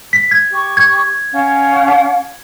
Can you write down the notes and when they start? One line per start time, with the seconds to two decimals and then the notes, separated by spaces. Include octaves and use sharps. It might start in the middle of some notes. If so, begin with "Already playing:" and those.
0.13 B6
0.31 G#6
0.50 G4 C#6
0.77 G#6
1.33 C#4 F5 F#5